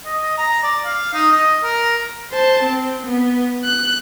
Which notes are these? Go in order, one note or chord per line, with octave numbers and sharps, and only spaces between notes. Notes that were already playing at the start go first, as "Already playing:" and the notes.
D#5
D#5
A#5
D5
F5
D#4
D#5
A#4
C5 A5
C4
B3
F#6